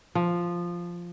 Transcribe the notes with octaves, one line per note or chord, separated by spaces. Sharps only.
F3